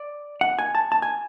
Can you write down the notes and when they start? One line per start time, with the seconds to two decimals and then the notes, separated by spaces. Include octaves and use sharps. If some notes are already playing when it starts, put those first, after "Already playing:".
Already playing: D5
0.41 F#5
0.59 G#5
0.75 A5
0.92 A5
1.02 G#5